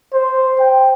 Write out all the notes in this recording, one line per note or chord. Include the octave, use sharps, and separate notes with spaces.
C5
G5